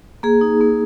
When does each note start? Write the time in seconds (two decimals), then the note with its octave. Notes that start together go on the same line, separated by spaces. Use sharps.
0.23 A#3 G#4
0.41 D#4
0.61 A#3